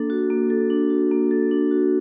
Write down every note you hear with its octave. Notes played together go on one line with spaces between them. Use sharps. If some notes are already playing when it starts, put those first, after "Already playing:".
Already playing: A#3 D4 A4
F#4
A#3
A4
D4
F#4
A#3
A4
D4
F#4